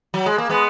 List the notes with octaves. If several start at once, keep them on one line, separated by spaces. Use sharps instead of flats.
F#3
G#3
A#3
G#3 B3